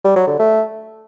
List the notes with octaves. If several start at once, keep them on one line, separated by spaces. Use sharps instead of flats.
G3
F#3
D3
A3